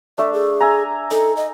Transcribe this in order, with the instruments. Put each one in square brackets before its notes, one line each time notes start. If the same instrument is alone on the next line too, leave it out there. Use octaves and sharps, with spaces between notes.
[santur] A3 D4 [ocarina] E5
[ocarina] G#4
[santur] E5 G#5 A#5
[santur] D#4 [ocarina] A4
[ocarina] D#5